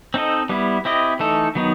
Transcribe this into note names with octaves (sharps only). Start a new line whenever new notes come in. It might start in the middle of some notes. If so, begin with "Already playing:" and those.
C4 D#4 A4 D#5
G3 B3 E4
C4 E4 G4 D#5
E3 A3 D#4 A4
D#3 F#3 B3 D#4